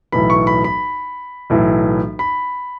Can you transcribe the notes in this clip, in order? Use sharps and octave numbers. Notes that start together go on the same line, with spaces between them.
B1 A2 E3 B5
C#6
B5
B5
B1 A2 E3
B5